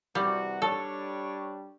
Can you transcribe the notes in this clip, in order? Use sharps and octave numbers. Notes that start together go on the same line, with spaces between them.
C3 E3 G3 F#4
G3 D4 A4 C#5